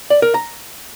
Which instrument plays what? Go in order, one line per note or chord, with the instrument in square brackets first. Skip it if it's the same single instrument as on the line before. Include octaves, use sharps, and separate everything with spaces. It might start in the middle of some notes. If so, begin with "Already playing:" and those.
[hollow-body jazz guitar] D5
A#4
A#5